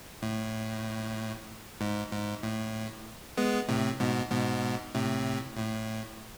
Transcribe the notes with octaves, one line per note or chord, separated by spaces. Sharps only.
A2
G#2
G#2
A2
G#3 B3
A2 C3
G#2 B2
G#2 B2
A2 C3
A2